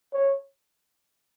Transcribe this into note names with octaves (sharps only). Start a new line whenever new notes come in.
C#5